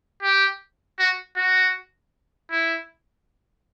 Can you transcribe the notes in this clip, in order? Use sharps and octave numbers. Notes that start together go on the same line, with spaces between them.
G4
F#4
F#4
E4